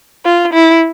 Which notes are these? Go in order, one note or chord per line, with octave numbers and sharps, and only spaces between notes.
F4
E4